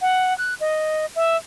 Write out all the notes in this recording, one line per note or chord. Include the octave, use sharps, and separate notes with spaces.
F#5
F#6
D#5
E5